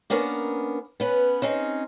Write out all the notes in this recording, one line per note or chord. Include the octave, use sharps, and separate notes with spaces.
A#3 B3 C#4 D4 A#4
B3 C#4 B4
C4 C#4 D#4 G#4